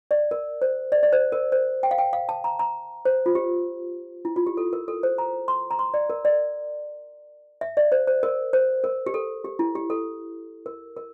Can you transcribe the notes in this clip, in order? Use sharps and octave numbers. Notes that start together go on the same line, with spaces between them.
D5
A#4
C5
D5
D5
C5
A#4
C5
G5
F5
G5
F5
A5
A#5
A#5
C5
F4
G4
E4
F4
G4
A4
A#4
A4
C5
A#5
C6
A#5
C6
D5
A#4
D5
E5
D5
C5
C5
A#4
C5
A#4
G4
A4
G4
E4
G4
A4
A#4
A#4